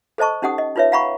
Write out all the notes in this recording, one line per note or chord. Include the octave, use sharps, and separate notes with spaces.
A4 C5 D#5 A5 C#6
C#4 D#4 G4 F#5 D#6
D#5
D#4 F4 B4 C#5 E5
F5 F#5 A#5 B5 C#6